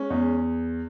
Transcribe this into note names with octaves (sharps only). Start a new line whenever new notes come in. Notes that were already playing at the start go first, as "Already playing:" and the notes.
Already playing: G#3 C#4
E2